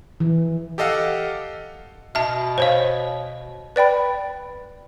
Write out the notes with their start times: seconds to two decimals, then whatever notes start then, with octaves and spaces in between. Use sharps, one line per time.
0.20 E3
0.78 G4 A4 D#5 F5 F#5
2.15 B2 E5 A5
2.58 C5 C#5 F5
3.76 B4 D5 G5 B5